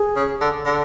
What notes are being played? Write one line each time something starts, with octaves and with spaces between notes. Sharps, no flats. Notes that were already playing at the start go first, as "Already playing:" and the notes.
Already playing: G#4
C#3
D3
D3